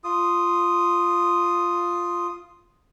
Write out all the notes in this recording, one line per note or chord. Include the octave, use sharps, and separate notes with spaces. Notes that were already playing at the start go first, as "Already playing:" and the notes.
F4 D#6